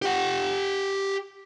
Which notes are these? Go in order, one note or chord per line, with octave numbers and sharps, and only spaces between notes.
G4 F#5